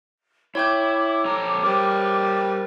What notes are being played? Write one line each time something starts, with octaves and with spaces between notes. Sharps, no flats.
E4 C#5 E5 G5 D6 G6
F2 A4 A#5
G3 A#4 C5